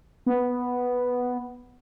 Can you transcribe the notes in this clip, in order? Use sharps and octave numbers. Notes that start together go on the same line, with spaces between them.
B3